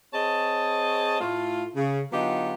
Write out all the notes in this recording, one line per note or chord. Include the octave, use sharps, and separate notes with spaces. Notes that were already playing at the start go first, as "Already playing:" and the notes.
C4 G#4 C#5 D#5 A5
A2 A3 E4 F4
C#3
D3 F#3 B3 D#4 F4 G4